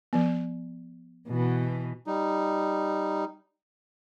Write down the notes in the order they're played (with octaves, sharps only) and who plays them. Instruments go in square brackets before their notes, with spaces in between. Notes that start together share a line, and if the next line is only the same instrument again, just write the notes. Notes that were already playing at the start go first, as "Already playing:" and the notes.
[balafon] F3 B3
[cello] B2 E3
[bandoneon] G3 D#4